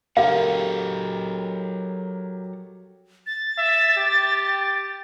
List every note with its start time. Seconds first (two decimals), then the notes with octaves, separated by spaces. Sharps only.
0.17 F#3 G4 A4 A#4 F5 F#5
3.27 A6
3.58 E5
3.97 G4